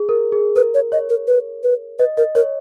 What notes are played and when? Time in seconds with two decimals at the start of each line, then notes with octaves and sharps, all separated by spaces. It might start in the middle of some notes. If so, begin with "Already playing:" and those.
Already playing: G#4
0.09 A#4
0.32 G#4
0.56 A#4 B4
0.74 C#5
0.92 C#5 D#5
1.09 A#4
1.27 B4
1.63 B4
1.99 B4 D#5
2.17 A#4 D#5
2.35 A#4 C#5